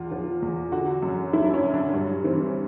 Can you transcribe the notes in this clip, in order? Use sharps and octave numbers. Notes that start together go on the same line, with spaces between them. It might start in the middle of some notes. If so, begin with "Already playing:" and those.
Already playing: E2 F4
F3
E2
D3 F#4
F#2
F#2 E4
D4
C#4
F#2
D4
G2 C#4
E3 C4